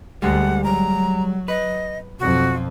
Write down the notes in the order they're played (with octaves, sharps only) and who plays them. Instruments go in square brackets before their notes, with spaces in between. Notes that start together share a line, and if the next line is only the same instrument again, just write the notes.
[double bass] D2 [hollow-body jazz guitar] G3 G#3 [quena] F#5
[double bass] F#3 [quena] A#5
[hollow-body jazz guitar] B4 [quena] D#5
[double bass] B1 F2 [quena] F#4